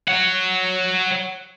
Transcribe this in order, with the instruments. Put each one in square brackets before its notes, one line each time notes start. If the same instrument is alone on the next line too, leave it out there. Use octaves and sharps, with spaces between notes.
[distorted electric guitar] C#5 F#5